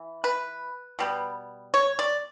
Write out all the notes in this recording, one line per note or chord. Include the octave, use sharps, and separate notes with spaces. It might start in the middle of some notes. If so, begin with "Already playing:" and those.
Already playing: E3
B4
B2 G3 B3
C#5
D5